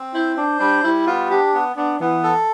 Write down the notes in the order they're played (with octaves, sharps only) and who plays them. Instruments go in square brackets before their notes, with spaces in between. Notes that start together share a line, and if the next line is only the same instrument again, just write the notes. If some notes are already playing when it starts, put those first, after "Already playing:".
Already playing: [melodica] C4
[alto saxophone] E4 [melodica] C5
[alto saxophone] D4 [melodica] C5
[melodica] G3 [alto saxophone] D4
[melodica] G3 [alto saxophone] E4
[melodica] B3 [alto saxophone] F4
[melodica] D4 [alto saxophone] G4
[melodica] B3
[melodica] B3 [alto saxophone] D4
[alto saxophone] E3 [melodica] B3
[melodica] A4